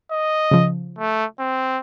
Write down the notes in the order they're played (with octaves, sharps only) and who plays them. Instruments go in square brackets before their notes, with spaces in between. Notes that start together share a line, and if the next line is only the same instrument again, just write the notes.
[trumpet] D#5
[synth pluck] C#3 F3
[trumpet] A3
C4